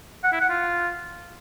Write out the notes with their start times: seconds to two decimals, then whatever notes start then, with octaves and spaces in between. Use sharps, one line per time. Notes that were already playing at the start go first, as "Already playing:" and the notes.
0.24 F#5
0.32 E4
0.41 F#5
0.49 F4